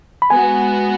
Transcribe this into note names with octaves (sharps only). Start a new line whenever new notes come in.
B5
G#3 B3 F#4 G#5